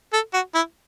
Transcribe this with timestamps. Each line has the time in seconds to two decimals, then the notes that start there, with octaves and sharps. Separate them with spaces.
0.13 A4
0.34 F#4
0.55 E4